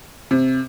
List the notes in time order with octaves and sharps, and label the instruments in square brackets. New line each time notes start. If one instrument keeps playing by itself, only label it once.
[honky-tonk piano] C3